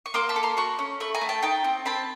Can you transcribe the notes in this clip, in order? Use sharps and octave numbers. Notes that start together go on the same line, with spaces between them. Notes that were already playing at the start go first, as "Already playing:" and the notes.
C#6
A#3 C6 D6
A5 B5
A4
A#5 C6
F#4 B5 C#6
C#4
A3 B5 C#6
G#5 A#5
A3
G5 A5
D#4 G5 A5
C4
C4 A5 B5